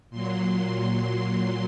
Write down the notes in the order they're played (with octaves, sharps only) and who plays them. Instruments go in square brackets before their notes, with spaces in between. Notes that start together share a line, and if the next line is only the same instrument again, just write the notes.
[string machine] A#2 F#3 C6